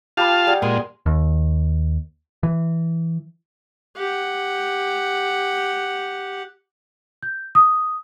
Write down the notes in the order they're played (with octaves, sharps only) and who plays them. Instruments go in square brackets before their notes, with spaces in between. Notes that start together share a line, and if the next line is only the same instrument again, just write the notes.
[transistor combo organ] F4 F5 A5 [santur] G4 B5
[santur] G3 G#4 F#5
[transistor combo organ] A#2 G#3 [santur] C6
[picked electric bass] D#2
E3
[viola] G4 F#5
[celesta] G6
D#6